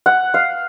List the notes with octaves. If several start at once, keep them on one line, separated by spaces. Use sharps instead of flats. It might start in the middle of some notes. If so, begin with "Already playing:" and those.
F#5
F5